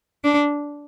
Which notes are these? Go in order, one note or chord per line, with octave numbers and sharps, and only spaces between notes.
D4